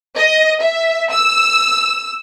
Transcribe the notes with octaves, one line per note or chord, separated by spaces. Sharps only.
D#5
E5
E6